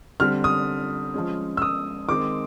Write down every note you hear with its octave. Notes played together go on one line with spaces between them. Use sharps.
D3 G3 C4 F6
D#6
F3 G#3 C#4
E6
D#6
D#3 G#3 C4 D6